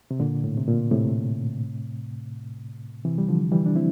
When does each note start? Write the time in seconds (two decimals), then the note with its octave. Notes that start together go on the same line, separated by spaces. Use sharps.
0.11 C3
0.20 A#2 D3
0.44 A2
0.58 C3
0.68 A#2
0.91 A2 C3
3.05 C3 E3
3.18 G3
3.28 D3 F3
3.52 E3 G3
3.66 D4
3.76 C4 E4